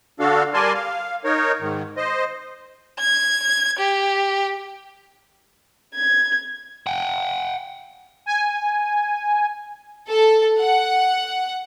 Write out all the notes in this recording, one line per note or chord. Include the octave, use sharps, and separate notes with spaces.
D3 D4 F#4 A4 F5
G3 A#4 D5 G#5 A5 C6
F5
D#4 A#4 C#5
G#2 D#3
C5 D#5
G#6
G4
G#6
F#5 G5
G#5
A4
F#5